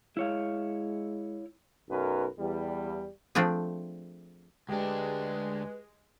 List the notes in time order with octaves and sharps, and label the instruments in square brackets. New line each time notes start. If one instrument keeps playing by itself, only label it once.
[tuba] G#3 [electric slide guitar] E4 C#5 F5
[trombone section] B1 F#2 A#4 B4
E2 G3
[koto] F3 A3 C4 D4 G#4
[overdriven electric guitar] D2 D4 [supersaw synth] G#3 [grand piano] G4 [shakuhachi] B4